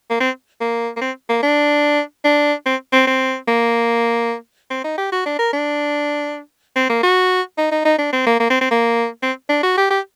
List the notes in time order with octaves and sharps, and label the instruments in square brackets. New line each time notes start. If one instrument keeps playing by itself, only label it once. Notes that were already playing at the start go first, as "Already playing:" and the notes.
[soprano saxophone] A#3
C4
A#3
A#3
C4
A#3
D4
D4
C4
C4
C4
A#3
C4
D#4
G4
F#4
D4
A#4
D4
C4
A#3
F#4
D#4
D#4
D#4
D4
C4
A#3
A#3
C4
C4
A#3
C4
D4
F#4
G4
G4